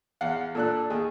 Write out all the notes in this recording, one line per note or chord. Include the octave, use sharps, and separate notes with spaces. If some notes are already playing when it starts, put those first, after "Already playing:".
E2 F5 F#5
A#2 D4 A4 F#6
D#2 G#4